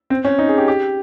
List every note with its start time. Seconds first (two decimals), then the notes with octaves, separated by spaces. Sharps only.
0.10 C4
0.25 C#4
0.39 D#4
0.48 G#4
0.58 G4
0.68 G4